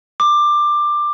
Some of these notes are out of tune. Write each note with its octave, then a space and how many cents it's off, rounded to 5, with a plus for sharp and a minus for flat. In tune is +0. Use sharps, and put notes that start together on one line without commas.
D6 +15